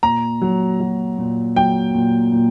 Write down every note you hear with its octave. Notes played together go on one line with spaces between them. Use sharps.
A#2 A#5
F#3
F#3
A#2
F#3 G5
A#2
A#2